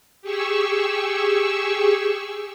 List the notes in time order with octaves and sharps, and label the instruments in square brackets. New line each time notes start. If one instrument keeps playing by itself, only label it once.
[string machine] G4 G#4 C#6 E6